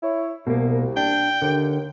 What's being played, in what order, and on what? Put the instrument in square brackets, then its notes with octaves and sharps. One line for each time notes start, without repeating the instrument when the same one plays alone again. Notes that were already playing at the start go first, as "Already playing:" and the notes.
[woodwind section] E4 C#5
[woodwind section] C2 [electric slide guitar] B2 A#3
[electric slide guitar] D4 [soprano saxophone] G5
[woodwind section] D#2 [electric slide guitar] D3